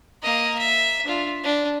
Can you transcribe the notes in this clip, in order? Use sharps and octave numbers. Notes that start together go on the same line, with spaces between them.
A#3 D#5
E5
D4 F4
D4